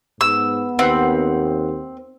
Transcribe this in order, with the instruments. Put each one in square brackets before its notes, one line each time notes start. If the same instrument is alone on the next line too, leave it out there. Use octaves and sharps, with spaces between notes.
[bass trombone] G#2 [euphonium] B3 [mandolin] E6
[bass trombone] D#2 [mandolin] C4 [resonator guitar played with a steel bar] B4 F#5